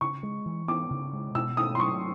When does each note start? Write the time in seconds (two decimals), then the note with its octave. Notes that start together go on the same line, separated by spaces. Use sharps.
0.01 C#3 C#6
0.23 G#3
0.46 E3
0.68 B3 D6
0.90 C#3
1.13 G#3
1.35 B2 E6
1.57 A3 D#6
1.75 C6
1.79 F#3 C#6